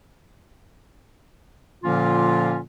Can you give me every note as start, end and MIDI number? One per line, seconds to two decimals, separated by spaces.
1.84 2.59 46
1.84 2.59 50
1.84 2.59 53
1.84 2.59 58
1.84 2.59 61
1.84 2.59 65